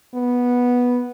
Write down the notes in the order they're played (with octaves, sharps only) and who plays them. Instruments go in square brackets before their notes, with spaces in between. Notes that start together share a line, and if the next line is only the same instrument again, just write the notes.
[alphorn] B3